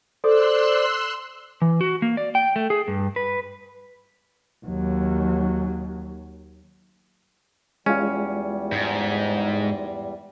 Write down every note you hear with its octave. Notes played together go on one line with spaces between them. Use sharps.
A4 C5 D5 C6 E6 F#6
E3
F#4
A#3
D5
G5
A3
G#4
G2
B4
D#2 F#3
E2 G3 G#3 C#4 F4
G#2